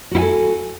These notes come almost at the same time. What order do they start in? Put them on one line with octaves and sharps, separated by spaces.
F#4 E4 G#5 A4